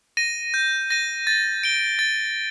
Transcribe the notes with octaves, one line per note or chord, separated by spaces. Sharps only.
A#6 D#7
G6
A#6 D#7
A6
D7 G7
A6